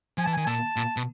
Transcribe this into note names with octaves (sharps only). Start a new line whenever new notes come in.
F3 G#5
E3 A5
D#3 G#5
A#2 A5
A#2
B2